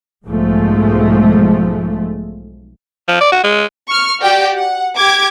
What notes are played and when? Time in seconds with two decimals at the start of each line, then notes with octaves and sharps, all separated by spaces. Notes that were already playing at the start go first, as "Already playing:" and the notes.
0.25 B1 G#2 F3 G#3 A3
3.08 F3
3.21 D5
3.32 F#4
3.43 G#3
3.88 C#6 F6
4.21 F#4 G4 D5 G5
4.56 F#5
4.96 G4 D6 G#6